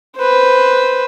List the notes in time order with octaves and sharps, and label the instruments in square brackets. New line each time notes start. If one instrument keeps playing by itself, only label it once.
[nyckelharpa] B4 C5